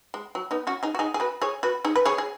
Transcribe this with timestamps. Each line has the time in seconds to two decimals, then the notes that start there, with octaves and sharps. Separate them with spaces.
0.14 G#3
0.35 F#3
0.51 B3 D#4
0.67 C#4 F#4
0.83 D#4 G#4
0.95 F#4
0.99 D#4 G#4
1.14 G#4
1.20 F#4 B4
1.42 G#4 C#5
1.63 F#4 B4
1.85 D#4 G#4
1.96 B4
2.05 G#4 C#5
2.18 G#4